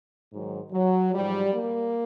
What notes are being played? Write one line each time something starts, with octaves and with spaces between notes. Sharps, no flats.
G#2 D#3 F#3
F#3
G#2 F3 G3
A#3